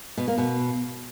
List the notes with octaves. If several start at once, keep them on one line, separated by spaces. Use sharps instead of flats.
B2
A#3
B2